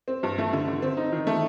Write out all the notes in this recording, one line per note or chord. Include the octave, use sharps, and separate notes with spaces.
C4
G2
A3
D3
D3
C4
D#4
D#3
A3